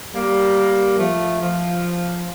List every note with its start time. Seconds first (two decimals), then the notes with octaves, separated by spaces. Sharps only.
0.14 G3 A#3
0.99 F3 A3
1.41 F3